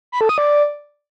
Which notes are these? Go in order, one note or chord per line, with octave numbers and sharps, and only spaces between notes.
B5
A4
D#6
D5